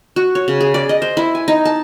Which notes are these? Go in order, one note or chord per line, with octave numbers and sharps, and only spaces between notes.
F#4
C#5
C#3
G#4
D5
D#5
C5
E4
G#5
D#4
A5